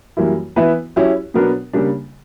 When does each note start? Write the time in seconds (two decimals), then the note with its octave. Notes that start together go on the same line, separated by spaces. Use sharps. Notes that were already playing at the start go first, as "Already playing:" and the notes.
0.17 F#2 E3 G3 A#3 E4
0.56 E3 B3 E4 B4 E5
0.96 F#3 C#4 E4 G4
1.34 B2 F#3 B3 D4 A#4
1.73 C#3 G3 A#3 D4